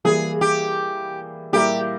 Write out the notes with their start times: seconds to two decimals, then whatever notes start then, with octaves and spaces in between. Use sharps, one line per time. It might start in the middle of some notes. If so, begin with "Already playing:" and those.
0.05 E3 G3 A#3 G#4
0.41 G4
1.52 A#2 G3 A#3 E4 G4 A#4